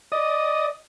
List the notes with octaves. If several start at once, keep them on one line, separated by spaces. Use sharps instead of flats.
D5 D#5 D#6